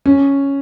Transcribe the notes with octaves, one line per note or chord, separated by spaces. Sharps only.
C#4